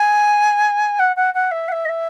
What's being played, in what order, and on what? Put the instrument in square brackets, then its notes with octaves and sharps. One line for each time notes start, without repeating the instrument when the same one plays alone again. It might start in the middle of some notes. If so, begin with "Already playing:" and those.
Already playing: [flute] G#5
F#5
F#5
F#5
E5
F#5
E5
D#5
E5